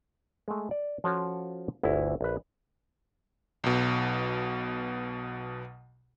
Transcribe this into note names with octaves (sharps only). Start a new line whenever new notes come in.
G#3 A3
D5
F3 C#4 F4 F#4 A4 C#5
G1 D2 E4
A#1 B4
B1 B2